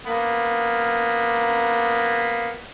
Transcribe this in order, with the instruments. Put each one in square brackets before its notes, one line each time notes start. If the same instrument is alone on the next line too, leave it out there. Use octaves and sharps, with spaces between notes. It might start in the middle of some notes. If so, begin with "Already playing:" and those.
[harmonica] A#3 B3